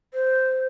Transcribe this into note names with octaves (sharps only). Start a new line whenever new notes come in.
C5